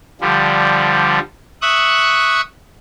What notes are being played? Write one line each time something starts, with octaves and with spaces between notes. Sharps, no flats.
D3 F3 G3
E5 C#6 D#6 F#6